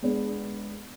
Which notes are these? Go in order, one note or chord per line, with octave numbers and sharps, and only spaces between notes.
G#3 B3 D4 G#4